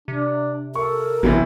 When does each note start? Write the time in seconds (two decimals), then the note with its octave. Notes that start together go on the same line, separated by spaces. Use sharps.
0.08 C3 D4
0.75 A4 A#4 C#6
1.23 A1 C3 E3 F#3